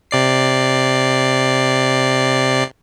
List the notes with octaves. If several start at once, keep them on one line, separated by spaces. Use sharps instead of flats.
C3 D5 C7